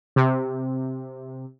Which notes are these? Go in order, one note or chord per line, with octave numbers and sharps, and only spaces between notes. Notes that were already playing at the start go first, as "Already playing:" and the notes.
C3